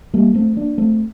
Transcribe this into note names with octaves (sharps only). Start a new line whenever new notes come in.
G3 A#3
A3 C4
A#3 D4
A3 C4